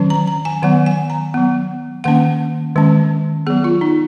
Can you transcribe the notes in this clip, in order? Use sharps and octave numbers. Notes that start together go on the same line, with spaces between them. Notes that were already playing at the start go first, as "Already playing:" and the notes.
Already playing: D#3 F#3 C#4
A#5
A#5
G#5
D#3 F#3 B3 F#5
G#5
A#5
F#3 B3
D#3 A#3 C#4 F#5
D#3 G#3 C#4
F#3 B3 G#4
F4
D#4